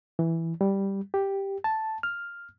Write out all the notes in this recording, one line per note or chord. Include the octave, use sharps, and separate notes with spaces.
E3
G3
G4
A5
F6